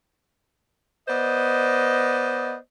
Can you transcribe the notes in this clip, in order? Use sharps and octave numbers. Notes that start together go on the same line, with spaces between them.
B3 C5 D5 D#5